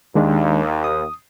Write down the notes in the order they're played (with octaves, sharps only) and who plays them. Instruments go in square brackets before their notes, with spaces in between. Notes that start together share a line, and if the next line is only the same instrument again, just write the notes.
[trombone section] D#2 [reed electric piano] D#3 G#3 D4
[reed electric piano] D#6